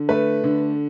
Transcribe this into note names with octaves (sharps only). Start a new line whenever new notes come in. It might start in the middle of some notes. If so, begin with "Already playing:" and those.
Already playing: D3
A3 B4
D3